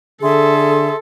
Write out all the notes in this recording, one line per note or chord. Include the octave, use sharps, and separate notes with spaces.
D3 G#4 A4 E5 C6